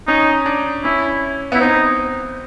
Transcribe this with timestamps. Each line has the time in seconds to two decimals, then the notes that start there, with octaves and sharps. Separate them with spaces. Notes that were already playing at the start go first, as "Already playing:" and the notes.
0.07 C#4 D#4
0.46 D4
0.84 C#4 E4
1.52 B3 E4
1.61 C4 D#4